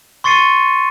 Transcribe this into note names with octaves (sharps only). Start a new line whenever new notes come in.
C6 C#6 A6 C7 C#7 D#7